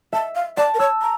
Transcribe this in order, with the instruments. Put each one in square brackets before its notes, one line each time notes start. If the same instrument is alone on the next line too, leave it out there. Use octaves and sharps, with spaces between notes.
[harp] E5 [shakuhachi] A5
[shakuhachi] F5
[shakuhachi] D5 [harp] A5
[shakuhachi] A#4
[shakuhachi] C#5 [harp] E6
[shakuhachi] A#5